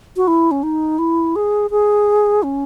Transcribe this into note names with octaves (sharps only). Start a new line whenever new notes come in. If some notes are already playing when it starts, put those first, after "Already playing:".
F#4
E4
C#4
D#4
E4
G#4
G#4
C#4